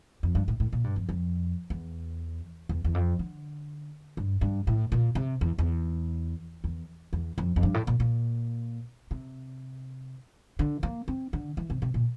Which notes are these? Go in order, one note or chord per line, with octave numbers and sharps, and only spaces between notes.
F2
G2
A2
A2
A#2
G2
F2
F2
E2
E2
E2
F2
D3
G2
G2
A2
A#2
C3
E2
E2
E2
E2
F2
F2
G2
A2
A#2
A#2
C3
D3
A#3
C4
D3
E3
C3
C3
A#2